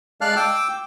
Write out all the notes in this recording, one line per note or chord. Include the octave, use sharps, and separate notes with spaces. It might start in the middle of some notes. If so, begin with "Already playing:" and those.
G#3 D5 F5 A5 F6 F#6
G5 D6 E6